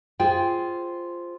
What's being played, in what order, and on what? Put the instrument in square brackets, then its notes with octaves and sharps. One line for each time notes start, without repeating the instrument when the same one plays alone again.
[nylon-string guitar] F4 G#4 C5 G5